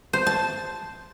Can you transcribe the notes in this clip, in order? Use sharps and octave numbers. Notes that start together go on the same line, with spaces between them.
C5
A5